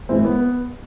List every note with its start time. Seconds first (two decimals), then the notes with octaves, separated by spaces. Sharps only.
0.09 A2 E3 G#3 C4
0.25 B3